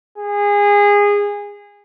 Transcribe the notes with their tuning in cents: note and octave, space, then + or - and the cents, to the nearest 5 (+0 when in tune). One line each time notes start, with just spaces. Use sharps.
G#4 -25